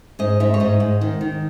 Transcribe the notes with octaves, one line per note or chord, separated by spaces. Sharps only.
G#2 D#5
G#2 E5
C#5
G#2 D#5
G#2
D#3
D#3